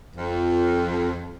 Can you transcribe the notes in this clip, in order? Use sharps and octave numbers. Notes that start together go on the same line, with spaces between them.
F2